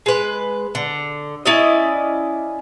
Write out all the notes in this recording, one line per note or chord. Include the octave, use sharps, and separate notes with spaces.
G#3 B4
D3
C#4 E4 D5 D#5